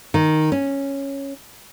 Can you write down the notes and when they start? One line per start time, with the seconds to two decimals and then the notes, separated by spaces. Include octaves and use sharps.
0.14 D#3
0.52 C#4